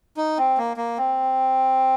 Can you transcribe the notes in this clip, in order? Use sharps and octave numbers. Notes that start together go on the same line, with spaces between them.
D#4
C4
A#3
A#3
C4